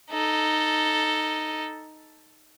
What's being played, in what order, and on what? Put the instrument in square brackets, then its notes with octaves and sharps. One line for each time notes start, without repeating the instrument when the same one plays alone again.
[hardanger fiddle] D#4 A4